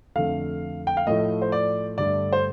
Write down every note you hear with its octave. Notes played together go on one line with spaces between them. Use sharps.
F2 D3 A3 F5
G5
F5
A2 F3 A3 D#5
C5
D5
G2 D3 A3 D5
C5